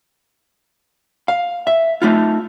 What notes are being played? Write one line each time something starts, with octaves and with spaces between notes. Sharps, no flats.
F5
E5
A3 D#4 F4